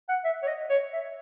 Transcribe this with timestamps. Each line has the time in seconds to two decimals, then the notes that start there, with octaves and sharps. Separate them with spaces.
0.09 F#5
0.24 E5
0.43 C#5
0.47 D#5
0.70 C#5
0.93 E5